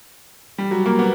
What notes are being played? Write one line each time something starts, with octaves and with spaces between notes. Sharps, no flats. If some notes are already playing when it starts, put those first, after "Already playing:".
G3
F#3
A#3
B3